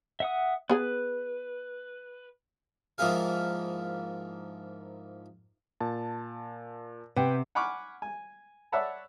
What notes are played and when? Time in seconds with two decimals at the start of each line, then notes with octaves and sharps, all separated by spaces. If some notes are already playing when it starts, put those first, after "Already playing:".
0.20 E5 F#5 D#6
0.70 B3 G#4 B4 G#5
2.98 G#2 F3 A#3 E4 G#4 F5
5.80 A#2 A5
7.16 C3 B4 F#5 G5
7.55 F#5 G#5 B5 C#6 D6 F6
8.02 G#5
8.72 C#5 D5 E5 F#5 A5 B5